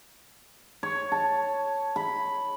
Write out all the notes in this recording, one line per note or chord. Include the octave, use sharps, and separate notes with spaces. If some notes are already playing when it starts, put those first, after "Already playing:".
C#5
A5
B5